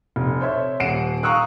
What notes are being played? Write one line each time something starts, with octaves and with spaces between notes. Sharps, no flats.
F1
C5 C#5 E5
D#1 F#5 C7 D7 E7
F5 A#5 C#6 D#6 E6 F#6